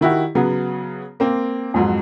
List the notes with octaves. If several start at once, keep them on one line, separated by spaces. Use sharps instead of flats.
D#3 E4 F#4 G4
C#3 F#3 B3
A#3 C4
F2 G#2 F#3